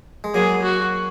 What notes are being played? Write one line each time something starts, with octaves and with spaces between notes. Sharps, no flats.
G#3
F#3 A#3 G#4
F#4